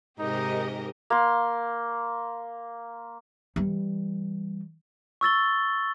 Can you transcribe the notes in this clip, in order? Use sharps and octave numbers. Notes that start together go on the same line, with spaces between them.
G#2 C3 D#4 G4 A#4 D#5
A#3 C6
E3 G3
C#6 E6 A6 G7